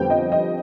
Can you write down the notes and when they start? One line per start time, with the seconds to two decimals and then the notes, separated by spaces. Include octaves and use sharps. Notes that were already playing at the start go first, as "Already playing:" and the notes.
Already playing: F2 D3 G3 B3 G5
0.10 D#5
0.32 D#5